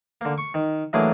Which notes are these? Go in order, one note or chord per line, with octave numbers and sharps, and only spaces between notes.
D3 A#3
C#6
D#3
E3 F#3 A3 A#3 D4 G#4